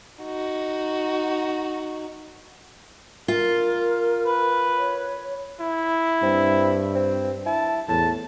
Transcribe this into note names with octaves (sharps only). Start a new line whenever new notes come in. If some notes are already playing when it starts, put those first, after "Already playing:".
D#4 F#4
F4 A#4
B4
C#5
E4
G2 C4
C4
E4 A5
E2 A2 A5